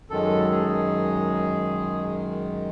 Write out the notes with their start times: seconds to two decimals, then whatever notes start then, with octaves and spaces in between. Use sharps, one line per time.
0.10 F#2 D#3 G#3 A4
0.52 G#4